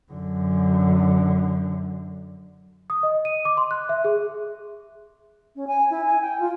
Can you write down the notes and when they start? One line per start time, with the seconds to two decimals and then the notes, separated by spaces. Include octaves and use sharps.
0.12 F#2 D3
2.90 D#6
3.03 D#5
3.25 D#7
3.45 D6
3.57 C6
3.71 F#6
3.89 E5
4.04 G#4
5.56 C#4
5.67 G#5
5.90 E4
6.06 G#5
6.21 G5
6.40 F4